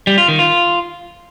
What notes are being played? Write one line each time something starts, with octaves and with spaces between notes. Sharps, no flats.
G3
F4
D#3
F4